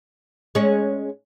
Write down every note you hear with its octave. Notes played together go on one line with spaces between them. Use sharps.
G#3 C#4